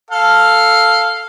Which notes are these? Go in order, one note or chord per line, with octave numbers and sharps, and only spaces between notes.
A4 F5